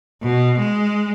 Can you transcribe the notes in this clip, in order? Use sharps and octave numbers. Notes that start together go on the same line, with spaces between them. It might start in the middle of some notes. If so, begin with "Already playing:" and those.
B2
G#3